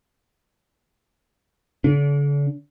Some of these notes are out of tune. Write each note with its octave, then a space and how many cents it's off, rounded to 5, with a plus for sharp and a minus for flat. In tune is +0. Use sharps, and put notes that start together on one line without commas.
D3 -45 D4 -40